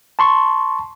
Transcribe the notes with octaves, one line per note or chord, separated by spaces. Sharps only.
A5 C6 C#6